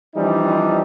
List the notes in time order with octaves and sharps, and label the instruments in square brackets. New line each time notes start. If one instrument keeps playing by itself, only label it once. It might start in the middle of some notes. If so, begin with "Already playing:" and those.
[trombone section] E3 F3 G3 C4 D4 D#4